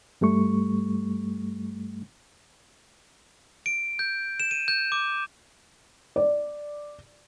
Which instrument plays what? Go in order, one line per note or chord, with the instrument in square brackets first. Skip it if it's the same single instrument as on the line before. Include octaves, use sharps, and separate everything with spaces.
[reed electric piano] G2 G3 A3 C#6
[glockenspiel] D7
G6
E7
D#7
G6
D6
[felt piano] D5